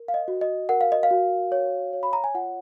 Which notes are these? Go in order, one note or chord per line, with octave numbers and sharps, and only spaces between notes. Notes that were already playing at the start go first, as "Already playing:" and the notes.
Already playing: A#4
F5
D#5
F#4
D#5
A#4 F#5
F5
D#5
F5
F#4
C#5
C#5
B5
A#5
G#5
F4 F#5